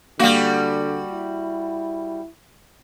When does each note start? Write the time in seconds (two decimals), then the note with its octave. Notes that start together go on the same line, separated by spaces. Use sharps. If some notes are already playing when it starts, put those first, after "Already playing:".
0.19 D3 G3 A#3 F#4 F5
1.11 E4